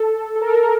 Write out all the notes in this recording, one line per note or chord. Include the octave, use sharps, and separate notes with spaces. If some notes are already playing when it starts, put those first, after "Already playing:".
Already playing: A4
A4
A#4